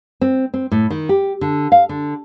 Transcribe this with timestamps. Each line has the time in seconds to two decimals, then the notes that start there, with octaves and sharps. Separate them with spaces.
0.21 C4
0.54 C4
0.71 A2
0.90 D#3
1.09 G4
1.41 D3
1.72 F5
1.89 D3